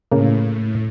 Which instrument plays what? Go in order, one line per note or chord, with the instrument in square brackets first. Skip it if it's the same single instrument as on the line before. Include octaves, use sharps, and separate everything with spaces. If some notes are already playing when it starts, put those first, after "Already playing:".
[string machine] A2 [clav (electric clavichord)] C#3 A#3